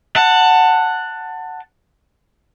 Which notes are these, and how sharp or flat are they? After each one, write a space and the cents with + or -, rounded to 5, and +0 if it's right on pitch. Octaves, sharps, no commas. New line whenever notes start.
F#5 +0 A5 +20